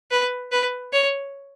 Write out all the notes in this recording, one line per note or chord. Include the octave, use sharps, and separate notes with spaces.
B4
B4
C#5